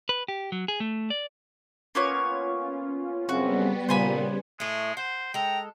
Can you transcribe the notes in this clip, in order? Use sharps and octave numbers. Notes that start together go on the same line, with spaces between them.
B4
G4
F#3
G#4
A3
D5
A#3 B3 C#4 F4 C#5
F#2 C#3 G3 B3 C4 F#4
A#2 C#3 C5 G#5 B5
A2 G#3 A3
C5 F#5
G#3 A4 G5 A#5